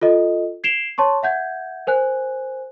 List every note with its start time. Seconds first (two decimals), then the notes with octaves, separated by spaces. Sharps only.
0.01 F4 A4 D#5
0.64 G#6 C7 D7 E7 F7 G7
0.98 C#5 A5 C6 C#6
1.23 E5 F#5 G6 G#6
1.87 A#4 C5 G#5 F#6